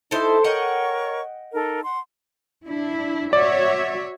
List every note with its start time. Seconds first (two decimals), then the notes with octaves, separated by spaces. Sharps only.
0.11 D#4 E4 A4 C5
0.44 A#4 C#5 D#5 F#5 G5 C#6
1.53 D#4 A4 A#4
1.84 F#5 C6
2.67 D4 E4
3.33 F#4 C#5 D5 E5